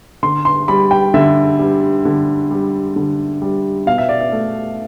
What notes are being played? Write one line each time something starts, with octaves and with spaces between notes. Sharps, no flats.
D3 C6
C6
G3 B5
G5
D3 E5
G3
D3
G3
D3
G3
B2 F5
E5
D5
E5
A3